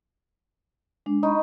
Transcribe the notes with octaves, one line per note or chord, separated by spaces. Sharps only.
G#3 D4
D#4 D#5 B5 C#6